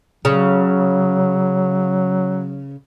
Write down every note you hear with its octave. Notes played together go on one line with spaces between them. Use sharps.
C#3 F#3